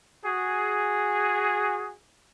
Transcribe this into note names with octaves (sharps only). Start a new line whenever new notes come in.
F#4 G#4